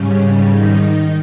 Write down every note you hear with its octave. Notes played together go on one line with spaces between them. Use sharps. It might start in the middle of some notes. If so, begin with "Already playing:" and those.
Already playing: G#2 C#3 G3 C#4
D#3 D#4